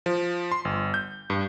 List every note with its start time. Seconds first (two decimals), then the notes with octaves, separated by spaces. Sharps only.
0.06 F3
0.52 C6
0.65 G1
0.94 G6
1.30 G2